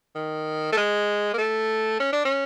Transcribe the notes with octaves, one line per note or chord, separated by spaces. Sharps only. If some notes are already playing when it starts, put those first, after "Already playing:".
D#3
A3
G#3
A#3
A3
C#4
D4
C#4